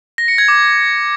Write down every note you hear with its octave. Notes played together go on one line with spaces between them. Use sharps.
A#6
C#7
G#6
D6